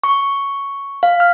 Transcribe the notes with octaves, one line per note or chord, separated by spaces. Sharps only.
C#6
F5
F6